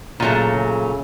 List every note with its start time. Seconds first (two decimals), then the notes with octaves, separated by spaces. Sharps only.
0.20 A#2 C#3 F#3 A3
0.57 C#3